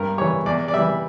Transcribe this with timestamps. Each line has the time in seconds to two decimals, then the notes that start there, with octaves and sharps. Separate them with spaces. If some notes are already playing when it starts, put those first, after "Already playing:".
Already playing: G2 A#4
0.18 E3 G3 C#5
0.46 E2 D5
0.68 D5
0.74 E3 G3 E5